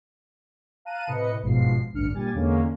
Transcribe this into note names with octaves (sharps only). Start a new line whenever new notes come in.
F5 A5 A#5 F#6 D#7
A2 C3 B4 D#5 C#7
G1 G#2 B2 F3 C7
A1 D2 G2 D4 F6 C#7
A#2 G3 G#5 A6
E2 D3 G#3 A#3 C#4